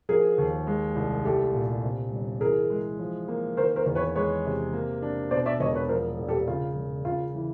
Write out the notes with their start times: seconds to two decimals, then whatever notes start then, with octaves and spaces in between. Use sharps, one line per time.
0.09 F3 G#4 A#4
0.38 D#2
0.67 G#3
0.96 C2
1.25 A3 G4 A4
1.54 A#2
1.83 C3
2.12 G1
2.41 E3 G#4 A#4
2.70 G#3
2.99 F3
3.28 A#3
3.57 D#3 A#4 C5
3.76 A#4 C5
3.86 E2
3.95 B4 C#5
4.15 G#3 B4 C#5
4.45 C3
4.73 A#3
5.02 D4
5.31 B2 C5 D5
5.46 D5 E5
5.60 E1 C#5 D#5
5.75 B4 C#5
5.89 F3 A#4 C5
6.18 A#1
6.28 G4 A4
6.47 C#3 F4
6.76 E1
7.05 C#3 F4
7.35 E3